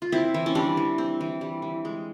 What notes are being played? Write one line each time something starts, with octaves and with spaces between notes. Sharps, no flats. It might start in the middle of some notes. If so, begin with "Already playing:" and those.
F4
C4 E4
E3
C#4
G3 D4
E3
C4
E3
G3
E3
G#3